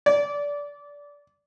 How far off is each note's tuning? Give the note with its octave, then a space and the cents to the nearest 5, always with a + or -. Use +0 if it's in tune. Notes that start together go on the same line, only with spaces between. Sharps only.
D5 -20